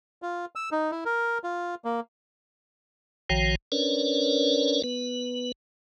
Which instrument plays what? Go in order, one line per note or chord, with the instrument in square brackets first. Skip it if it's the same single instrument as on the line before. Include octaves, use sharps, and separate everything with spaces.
[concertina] F4
E6
D#4
E4
A#4
F4
A#3
[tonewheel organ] A#1 D#3 F3 F#4 C#5 G5
C#4 D4 A#4 B4 C#5 D5
B3 B4